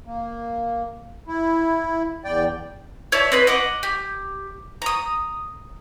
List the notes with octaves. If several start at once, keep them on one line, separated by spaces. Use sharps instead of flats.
A#3
E4
E2 D5 G5
C#5 D5 E5 A5
C4 B4 D#5
D#5 F#5 D6
G4
A#5 D#6